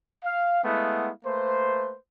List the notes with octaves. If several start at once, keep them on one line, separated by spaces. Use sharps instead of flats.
F5
G#3 A3 B3 E4 F5 F#5
A3 A#3 B4 C5